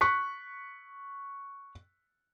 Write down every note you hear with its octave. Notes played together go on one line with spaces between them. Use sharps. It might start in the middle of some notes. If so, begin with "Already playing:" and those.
C#6 F#6 B6